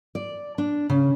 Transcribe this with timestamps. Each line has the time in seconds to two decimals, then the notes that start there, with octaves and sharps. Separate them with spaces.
0.15 D5
0.58 D4
0.90 C#3